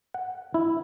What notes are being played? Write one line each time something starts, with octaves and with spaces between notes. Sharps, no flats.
F#5
E4